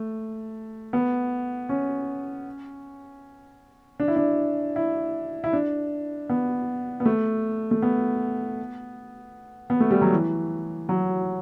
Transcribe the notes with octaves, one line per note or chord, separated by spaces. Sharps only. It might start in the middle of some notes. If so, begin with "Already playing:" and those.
Already playing: A3
B3
C#4
D4
E4
D4
E4
E4
D4
B3
B3
A3
A3
B3
B3
A3
G3
F#3
E3
F#3